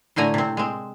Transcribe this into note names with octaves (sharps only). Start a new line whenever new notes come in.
A2 D3 A3 G#5 A#5
C3 C4
G#3 C4